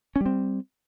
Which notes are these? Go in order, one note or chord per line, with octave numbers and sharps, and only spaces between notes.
G3 C4 C#4